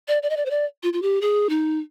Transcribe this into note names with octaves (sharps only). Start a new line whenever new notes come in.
D5
D5
D#5
D5
C5
D5
F4
F4
G4
G#4
D#4